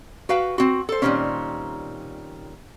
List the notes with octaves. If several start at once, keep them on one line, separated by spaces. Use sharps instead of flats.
F#4 B4 F5 G5
C4 F#4
A4 C5
A#2 D#3 G3 A#3 C4 C#4